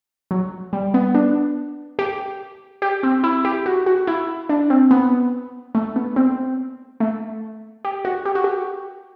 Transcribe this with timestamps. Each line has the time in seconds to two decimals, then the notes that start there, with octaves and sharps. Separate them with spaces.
0.31 F#3
0.73 G3
0.94 B3
1.15 D4
1.99 G4
2.82 G4
3.03 C4
3.24 E4
3.45 G4
3.66 F#4
3.86 F#4
4.07 E4
4.49 D4
4.70 C4
4.91 B3
5.75 A3
5.96 B3
6.16 C4
7.00 A3
7.85 G4
8.05 F#4
8.25 G4
8.35 F#4
8.44 G4